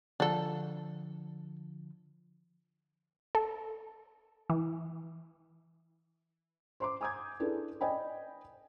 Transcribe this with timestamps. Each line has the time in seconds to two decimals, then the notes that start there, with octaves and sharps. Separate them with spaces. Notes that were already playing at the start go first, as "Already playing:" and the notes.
0.20 D3 F3 D4 A4
3.35 A4
4.50 E3
6.80 C5 C6 D6
7.01 G#5 D6 D#6 G6 G#6
7.40 D4 E4 G#4 A4 B4
7.81 D5 D#5 G5 G#5 B5